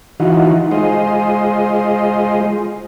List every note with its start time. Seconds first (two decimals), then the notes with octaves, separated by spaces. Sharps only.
0.20 E3 D#4 F4 F#4
0.71 G#3 F4 C5 D#5